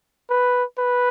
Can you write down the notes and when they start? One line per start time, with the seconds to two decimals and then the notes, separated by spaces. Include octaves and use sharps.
0.30 B4
0.78 B4